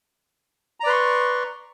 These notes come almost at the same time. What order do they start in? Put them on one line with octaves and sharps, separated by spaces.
A#5 D5 B4 C6 C#6